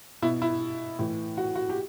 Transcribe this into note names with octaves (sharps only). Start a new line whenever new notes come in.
B2 E4
E4
A2 E3
F#4
F#4
G4